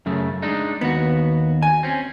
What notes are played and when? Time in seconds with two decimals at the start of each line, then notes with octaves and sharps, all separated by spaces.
0.06 F#2 C#3 A3
0.42 G#3 D4 D#4
0.81 D#2 B3 F#4
1.62 G#5
1.83 C4 C#4